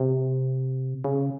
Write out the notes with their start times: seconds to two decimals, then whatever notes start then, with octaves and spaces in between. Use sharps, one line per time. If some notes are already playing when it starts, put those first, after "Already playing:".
Already playing: C3
1.04 C#3